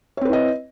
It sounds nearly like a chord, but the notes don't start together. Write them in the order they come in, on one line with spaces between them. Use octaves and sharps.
C#5 C4 B4 E4 D#5